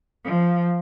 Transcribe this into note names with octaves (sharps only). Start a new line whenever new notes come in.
F3